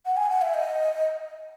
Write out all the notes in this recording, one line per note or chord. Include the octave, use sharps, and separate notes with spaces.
F#5
G#5
F#5
E5
D#5